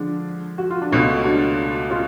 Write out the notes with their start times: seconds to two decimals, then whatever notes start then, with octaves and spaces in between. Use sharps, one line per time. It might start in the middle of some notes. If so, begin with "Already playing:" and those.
Already playing: D3 F3 G#3 D4
0.58 F#4
0.70 F4
0.82 D4
0.92 C#2 B2 A3 C#4 F4
1.24 D4 F#4
1.90 C#4 F4